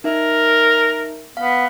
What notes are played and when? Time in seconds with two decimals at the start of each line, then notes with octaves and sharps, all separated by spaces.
0.04 D#4 A#4 E5
1.37 B3 F5